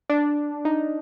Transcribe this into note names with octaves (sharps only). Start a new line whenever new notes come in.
D4
D#4